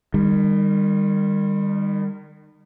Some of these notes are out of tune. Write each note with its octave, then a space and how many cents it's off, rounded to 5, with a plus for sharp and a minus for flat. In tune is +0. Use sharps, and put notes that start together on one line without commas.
D#3 -30 G3 +25